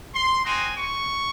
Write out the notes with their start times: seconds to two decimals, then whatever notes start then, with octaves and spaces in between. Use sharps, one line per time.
0.13 C6
0.44 C4 D#4 F#4 G#5
0.76 C#6